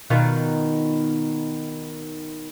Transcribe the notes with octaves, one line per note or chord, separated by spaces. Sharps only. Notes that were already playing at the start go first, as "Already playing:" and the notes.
B2 D#3 F4